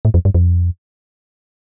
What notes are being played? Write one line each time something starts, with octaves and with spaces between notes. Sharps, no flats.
A2
F2
G2
F2